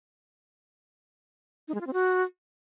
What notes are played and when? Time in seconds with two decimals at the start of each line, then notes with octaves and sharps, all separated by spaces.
1.68 D#4
1.74 G#3
1.81 F4
1.87 C4
1.93 F#4